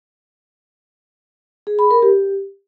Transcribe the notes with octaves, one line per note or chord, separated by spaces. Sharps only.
G#4
B5
A#4
G4